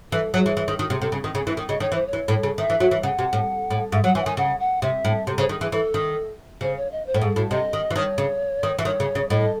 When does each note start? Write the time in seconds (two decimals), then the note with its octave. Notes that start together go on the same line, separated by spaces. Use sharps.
0.11 E3 A4
0.34 F#3 G#4
0.46 E3
0.57 E3
0.68 D#3
0.79 D#3 F#4
0.90 C3 G#4
1.01 C3 A4
1.12 C#3
1.24 D#3
1.35 C#3
1.47 E3
1.57 D#3
1.69 C#3 D#5
1.80 D#3 C#5
1.92 E3
1.94 C5
2.07 C#5
2.13 E3
2.28 A2
2.43 C#3
2.58 D#3 E5
2.70 E3
2.80 F#3
2.91 E3
3.03 C#3 F#5
3.19 C3
3.33 A2
3.71 A2
3.92 G#2 E5
4.03 F#3 F#5
4.15 E3 G#5
4.22 F#5
4.26 D#3 G#5
4.37 C#3 F#5
4.60 F#5
4.82 C3 E5
5.05 A2
5.27 C3
5.38 C#3 C5
5.49 D#3 G#4
5.61 E3 G#4
5.72 E3 A4
5.94 D#3
6.61 C#3 C5
6.76 C#5
6.92 D#5
7.06 C5
7.14 A2
7.21 G#2 G#4
7.36 A2 F#4
7.51 C3 D#5
7.73 D#3
7.91 E3
7.95 D#3 C#5
8.18 C#3
8.63 D#3
8.78 E3
8.85 D#3 C#5
9.00 C#3
9.15 C#3
9.30 A2 D#5